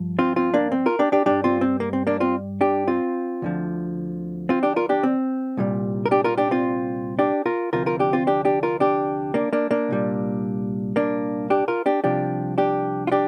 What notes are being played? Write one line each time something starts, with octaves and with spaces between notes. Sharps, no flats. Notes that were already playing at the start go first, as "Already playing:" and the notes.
Already playing: G2 F3
C4 F4
C4 F4
A#3 D4
C4
F4 A#4
D4 G4
D4 G4
G2 G3 D4 G4
C4 F4
C4
A#3
C4
A#3 D4
C4 F4
D4 G4
C4 F4
D2 D3 F3
C4 F4
D4 G4
F4 A#4
D4 G4
C4
C2 A#2 G3
A#4
D4 G4
F4 A#4
D4 G4
C4 F4
D4 G4
F4 A#4
D2 C3 F3 F4 A#4
F4 A#4
D4 G4
C4 F4
D4 G4
D4 G4
F4 A#4
D4 G4
A#3 D4
A#3 D4
A#3 D4
C2 A#2 G3
A#3 D4
D4 G4
F4 A#4
D4 G4
C2 C3 F3 D4 G4
D4 G4
F4
D4 G4